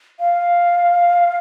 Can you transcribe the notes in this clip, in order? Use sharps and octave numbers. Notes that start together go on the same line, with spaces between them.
F5